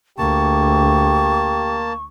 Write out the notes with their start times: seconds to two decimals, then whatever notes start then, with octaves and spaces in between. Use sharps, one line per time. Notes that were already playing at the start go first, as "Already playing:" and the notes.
0.19 D2 A#3 G4 A5 C#6